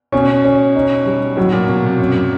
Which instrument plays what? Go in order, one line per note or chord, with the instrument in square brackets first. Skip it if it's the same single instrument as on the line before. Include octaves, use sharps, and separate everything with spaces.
[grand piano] B2 [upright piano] C#4
[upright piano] C#4
D#4
G3
[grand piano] A2 [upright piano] F#3
[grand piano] A#2
[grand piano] B2 [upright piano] F#3
[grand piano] C3
[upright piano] F#2